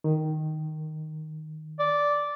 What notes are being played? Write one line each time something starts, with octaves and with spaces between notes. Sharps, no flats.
D#3
D5